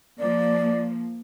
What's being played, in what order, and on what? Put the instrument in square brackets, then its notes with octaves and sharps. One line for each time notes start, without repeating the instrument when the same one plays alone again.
[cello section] F3 A#3 [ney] D5